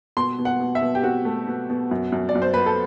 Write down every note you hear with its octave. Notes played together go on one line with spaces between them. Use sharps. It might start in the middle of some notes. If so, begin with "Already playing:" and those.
B2 C6
B2
F#5
B2
E5
B2
G4
C4 F#4
A3
B2
B2
F#2
F#2
D5
F#2
C5
B3 B4
A4